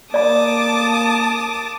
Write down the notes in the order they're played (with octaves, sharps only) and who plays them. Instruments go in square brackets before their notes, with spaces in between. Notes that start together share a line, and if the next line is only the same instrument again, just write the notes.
[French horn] A#3 [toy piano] D5 A#5 [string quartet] A5 D6 D#6